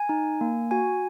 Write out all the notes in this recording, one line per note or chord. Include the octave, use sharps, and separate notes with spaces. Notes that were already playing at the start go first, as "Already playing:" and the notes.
Already playing: G#5
D#4
A#3
F#4 G#5